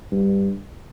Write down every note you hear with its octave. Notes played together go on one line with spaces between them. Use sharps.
G2